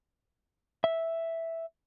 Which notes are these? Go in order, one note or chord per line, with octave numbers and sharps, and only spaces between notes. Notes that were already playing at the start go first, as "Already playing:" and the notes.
E5